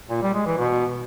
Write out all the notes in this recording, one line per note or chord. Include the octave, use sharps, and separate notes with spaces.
A#2
G3
G#3
E3
B2